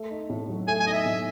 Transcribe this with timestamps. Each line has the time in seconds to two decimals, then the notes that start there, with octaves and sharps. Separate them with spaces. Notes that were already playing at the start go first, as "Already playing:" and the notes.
Already playing: A3
0.10 D#4
0.30 A2
0.49 F#3
0.68 A3 G#5
0.80 G#5
0.86 D#4 D#5
0.93 E5
1.05 A2